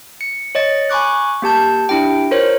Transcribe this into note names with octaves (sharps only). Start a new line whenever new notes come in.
C#7
C#5 D#5 A6 C#7
G#5 B5 C#6 D6 F#6
A#3 G4 A5 G6
D4 E4 G4 G5
F4 A#4 C5 C#5